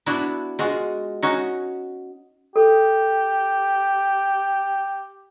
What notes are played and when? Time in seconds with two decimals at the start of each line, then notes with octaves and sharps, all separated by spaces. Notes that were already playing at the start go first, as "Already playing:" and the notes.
0.06 B3 D4 E4 F#4
0.59 G#3 F4 F#4
1.23 C#4 D#4 F#4
2.56 G4 A4